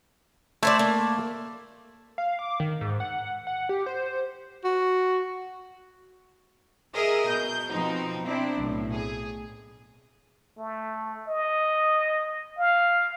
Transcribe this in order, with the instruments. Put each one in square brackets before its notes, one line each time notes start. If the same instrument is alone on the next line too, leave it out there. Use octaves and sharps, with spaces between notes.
[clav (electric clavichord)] A3 [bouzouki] E4 C5 D5
[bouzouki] A#3
[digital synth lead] F5
D6
D#3
G#2
F#5
F#5
G4
C5
[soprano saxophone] F#4
[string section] G#4 A#4 D#5 E5
B2 G6
B2 F3 C4 D#4
C4 D4 E4
B1 A2
G#4
[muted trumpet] A3
D#5
F5